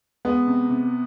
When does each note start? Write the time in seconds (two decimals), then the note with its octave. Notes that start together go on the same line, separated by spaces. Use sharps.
0.25 G#3 B3
0.47 C3
0.70 C3